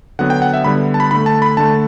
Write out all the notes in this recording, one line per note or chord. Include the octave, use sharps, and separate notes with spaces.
D3 F#3 B3 F#5
G5
F#5
E5
D3 G3 B3 B5
A5
B5
D3 A3 B5
A5
B5
D3 A3 A5